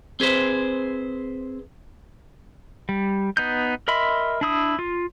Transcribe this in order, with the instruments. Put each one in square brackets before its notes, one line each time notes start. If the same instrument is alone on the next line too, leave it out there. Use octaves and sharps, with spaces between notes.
[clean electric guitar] C4 G#4 B4 C5
[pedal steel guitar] G3
B3 D#4 G6
A#4 D#5 E5 B5 C6
D4 E4 D#6
F4